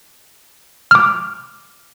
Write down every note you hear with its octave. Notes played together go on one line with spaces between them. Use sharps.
D6 F6